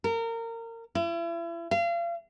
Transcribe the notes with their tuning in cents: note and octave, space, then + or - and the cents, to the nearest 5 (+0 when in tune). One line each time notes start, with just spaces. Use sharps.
A#4 -25
E4 +40
F5 -35